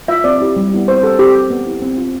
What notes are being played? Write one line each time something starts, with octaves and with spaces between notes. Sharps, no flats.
F4 E5
C4 D5
E4 G4
G3
B3 E4 G4
C4 C5
G4 A4
C4 G4
G4
B3
E4 G4
C4
F4